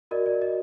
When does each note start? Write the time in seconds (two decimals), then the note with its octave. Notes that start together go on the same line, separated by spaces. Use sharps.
0.11 F#4 A#4 D5 D#5
0.26 D5
0.42 D#5